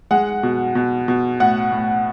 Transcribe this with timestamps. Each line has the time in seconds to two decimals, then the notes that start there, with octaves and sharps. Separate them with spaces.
0.11 G#3 F#5
0.43 B2
0.75 B2
1.08 B2
1.40 A2 F#5
1.72 A2